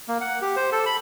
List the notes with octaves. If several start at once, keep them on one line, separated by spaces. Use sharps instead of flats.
A#3
F#5
G4
C5
A4
B5